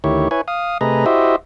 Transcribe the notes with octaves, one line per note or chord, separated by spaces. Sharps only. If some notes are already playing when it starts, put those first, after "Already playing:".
D2 D#3 E4 G4 C#5
E4 B4 C#5 G#5
F5 D#6
C3 A3 G#4 B4 D#5 A#5
E4 F#4 G4 C5 D#5 E5